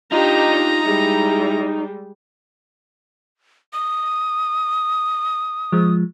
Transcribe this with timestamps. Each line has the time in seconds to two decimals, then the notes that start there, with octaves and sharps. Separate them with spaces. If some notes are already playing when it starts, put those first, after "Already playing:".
0.12 D4 D#4 F4 G4 D#5 A#5
0.84 G3 G#3 E4
3.73 D#6
5.72 F3 G#3